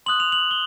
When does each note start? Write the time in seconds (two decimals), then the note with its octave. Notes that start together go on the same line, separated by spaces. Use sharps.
0.06 C6 D#6 F#6 F#7
0.20 F7
0.32 F#7
0.51 G7